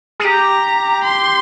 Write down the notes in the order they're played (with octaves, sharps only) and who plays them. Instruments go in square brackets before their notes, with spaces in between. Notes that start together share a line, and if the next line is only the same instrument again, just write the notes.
[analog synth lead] G#4
[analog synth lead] G4 [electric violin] A#5
[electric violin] C6